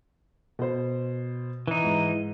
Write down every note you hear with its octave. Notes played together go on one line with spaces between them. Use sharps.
B2 C5
E3 D#4
G#2